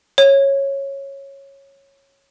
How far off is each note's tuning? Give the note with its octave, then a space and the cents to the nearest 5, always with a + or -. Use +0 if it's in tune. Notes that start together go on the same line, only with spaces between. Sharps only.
C#5 -10